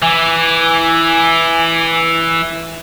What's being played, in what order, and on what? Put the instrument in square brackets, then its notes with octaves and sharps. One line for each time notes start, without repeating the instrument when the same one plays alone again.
[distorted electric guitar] E3 [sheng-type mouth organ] G#5 D6